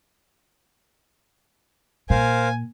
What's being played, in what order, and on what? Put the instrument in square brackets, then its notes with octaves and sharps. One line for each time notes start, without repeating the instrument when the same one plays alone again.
[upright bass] A#2 [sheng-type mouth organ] A#4 C5 F5 [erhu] G#5